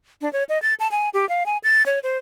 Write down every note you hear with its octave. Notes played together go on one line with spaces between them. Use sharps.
D4
C#5
D#5
A6
A5
G#5
G4
F5
G#5
A6
C#5
C5